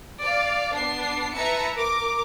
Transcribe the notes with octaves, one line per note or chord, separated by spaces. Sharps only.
D5 F5
B3 D4 C7
E4 B4 E5 A5 A#5 C#7
A#4 D6